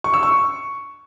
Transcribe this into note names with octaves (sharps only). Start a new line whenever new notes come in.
C#6
E6
C#6